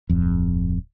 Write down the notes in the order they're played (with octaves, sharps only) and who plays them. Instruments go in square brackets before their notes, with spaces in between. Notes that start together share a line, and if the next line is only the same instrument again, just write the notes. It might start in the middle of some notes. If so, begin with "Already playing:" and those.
[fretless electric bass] D1 F2